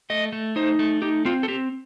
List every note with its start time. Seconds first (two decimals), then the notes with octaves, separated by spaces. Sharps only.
0.10 A3 D#5
0.32 A3
0.56 D#4 C5
0.79 A3
1.02 D#4 G4
1.25 C4 F4
1.43 A4
1.48 C4 G4